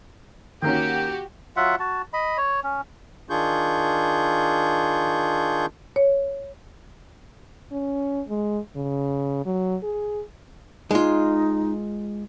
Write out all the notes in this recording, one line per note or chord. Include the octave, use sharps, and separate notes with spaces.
D#3 A#3 C#4 F#4 G4 G5
F#3 F4 E5 F#5
F#4 A5
D#5 B5
C#5
C#4
D#3 D4 F4 G#4 C#6 G6
C#5
C#4
G#3
C#3
F#3
G#4
G#3 D#4 F4